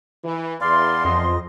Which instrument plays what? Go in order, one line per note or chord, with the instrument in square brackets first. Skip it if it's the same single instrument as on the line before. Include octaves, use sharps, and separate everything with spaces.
[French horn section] E3
[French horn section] E2 [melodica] D5 F5 [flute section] C6
[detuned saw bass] F2 [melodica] D#5